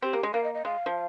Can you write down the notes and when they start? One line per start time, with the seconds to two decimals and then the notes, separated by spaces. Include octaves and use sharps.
0.02 C4 G4
0.13 A#3
0.23 G#3
0.34 A#3 F5
0.44 D#5
0.54 D#5
0.65 G#3 F5
0.86 F3